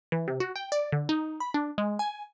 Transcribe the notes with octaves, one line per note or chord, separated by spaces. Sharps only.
E3
C3
F#4
G5
D5
D3
D#4
B5
D4
G#3
G#5